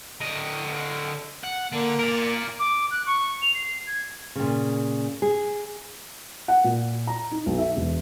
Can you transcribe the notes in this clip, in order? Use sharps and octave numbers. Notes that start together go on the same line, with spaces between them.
D3 D#5
F#5
D3 A#3
A#4 D5
D6
F#6
C#6
F7
C7
G#6
A#2 C#3
G#4
F#5
A#2
A#5
D#4
B1
E5
E1